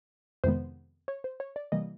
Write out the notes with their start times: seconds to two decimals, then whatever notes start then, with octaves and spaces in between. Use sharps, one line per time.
0.44 F2 C3 D#3 G#3 B3 C5
1.08 C#5
1.24 C5
1.40 C#5
1.56 D5
1.72 C3 E3 G3 A#3 D#5